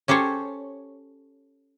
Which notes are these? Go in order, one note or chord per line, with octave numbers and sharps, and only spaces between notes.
C#4 G4 A4 C5 C#5